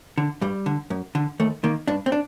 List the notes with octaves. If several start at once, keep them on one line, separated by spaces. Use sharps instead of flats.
D3
G2 G3
D3
F#2
D3
D#2 A3
D#3 A#3
G2 D4
C4
D4